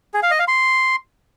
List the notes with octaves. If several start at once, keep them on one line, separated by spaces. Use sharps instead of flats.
G#4
F5
D#5
F5
C6